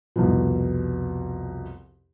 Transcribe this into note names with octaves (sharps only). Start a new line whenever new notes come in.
C2 F2 B2